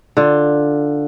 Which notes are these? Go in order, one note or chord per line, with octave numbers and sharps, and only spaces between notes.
D3 F4